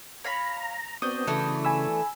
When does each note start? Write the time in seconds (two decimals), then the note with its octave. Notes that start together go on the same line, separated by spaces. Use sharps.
0.24 C#5 F5 A#5 B5
1.02 B3 C4 D4 F#4 D#6 G6
1.27 C#3 E3 A3 B3
1.65 G#5 B5 E6